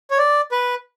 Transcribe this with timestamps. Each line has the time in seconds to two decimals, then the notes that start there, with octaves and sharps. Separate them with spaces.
0.11 C#5
0.18 D5
0.52 B4